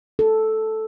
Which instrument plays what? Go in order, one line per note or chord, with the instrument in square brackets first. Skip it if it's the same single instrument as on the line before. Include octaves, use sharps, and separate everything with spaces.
[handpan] A4